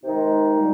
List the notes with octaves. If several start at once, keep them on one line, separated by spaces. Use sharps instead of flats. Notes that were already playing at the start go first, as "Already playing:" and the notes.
C3 D#3 G#3 D#4
A#2 G3